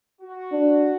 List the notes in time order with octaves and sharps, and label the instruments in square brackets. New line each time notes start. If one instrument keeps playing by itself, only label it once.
[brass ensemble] F#4
[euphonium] D4